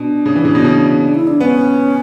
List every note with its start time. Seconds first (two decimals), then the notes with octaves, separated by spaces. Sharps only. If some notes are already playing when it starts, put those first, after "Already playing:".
Already playing: B2 D4
0.26 C#3
0.36 E3
0.45 C#3
0.55 B2
0.65 C#3
1.02 D4
1.15 E4
1.27 D4
1.40 B3 C#4